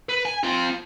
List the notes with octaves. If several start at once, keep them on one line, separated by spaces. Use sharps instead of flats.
B4
G#5
C4 F4